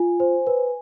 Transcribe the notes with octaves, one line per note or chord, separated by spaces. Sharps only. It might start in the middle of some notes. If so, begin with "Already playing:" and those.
Already playing: F4 G#5
C5
B4